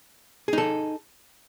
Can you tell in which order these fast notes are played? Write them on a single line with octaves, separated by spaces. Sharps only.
G#4 D#4 A4